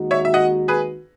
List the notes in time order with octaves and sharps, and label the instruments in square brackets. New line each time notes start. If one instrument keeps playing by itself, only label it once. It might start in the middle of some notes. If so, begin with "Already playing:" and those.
Already playing: [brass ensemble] D#2 D#3 G#3 D#4 F#4
[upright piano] C#5 E5
E5
D#5 F#5
G#4 B4